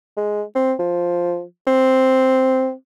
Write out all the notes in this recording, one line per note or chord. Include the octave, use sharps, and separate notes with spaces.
G#3
C4
F3
C4